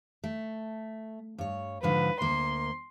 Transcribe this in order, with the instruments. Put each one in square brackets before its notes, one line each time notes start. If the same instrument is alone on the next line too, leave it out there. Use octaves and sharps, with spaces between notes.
[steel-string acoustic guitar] A3
G2 C#5
[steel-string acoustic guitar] G#2 D3 F3 [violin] B4
[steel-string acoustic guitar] D2 A#3 [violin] C6